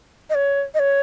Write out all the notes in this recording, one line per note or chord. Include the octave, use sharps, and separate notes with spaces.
D#5
C#5
D#5
C#5